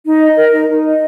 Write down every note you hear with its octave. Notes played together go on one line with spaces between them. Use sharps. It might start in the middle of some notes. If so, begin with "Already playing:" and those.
D#4
D#5
A#4
D#4
D#4
D#5